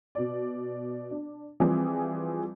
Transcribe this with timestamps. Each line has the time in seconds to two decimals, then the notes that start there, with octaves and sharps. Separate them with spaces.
0.15 B2 D5
1.11 D4
1.60 E3 F3 G3 C4 G#4